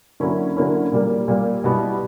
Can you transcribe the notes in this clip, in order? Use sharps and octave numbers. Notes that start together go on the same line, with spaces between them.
D3 F#3 A#3 C#4 E4
D3 F#3 A#3 C#4 E4
A#2 G3 A#3
A#2 G3 A#3
B2 G3 B3 E4